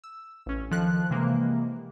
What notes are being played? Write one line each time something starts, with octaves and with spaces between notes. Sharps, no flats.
E6
A1 C#4
D#3 F3 A4 F#6
C3 E3 G#3 A#3